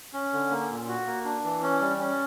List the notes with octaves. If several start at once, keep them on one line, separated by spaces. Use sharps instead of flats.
C#4
D3
A#3
A#2
F#4
A#3
D4
E3
C#4
G3
C#4